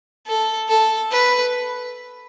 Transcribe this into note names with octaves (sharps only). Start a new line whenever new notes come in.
A4
A4
B4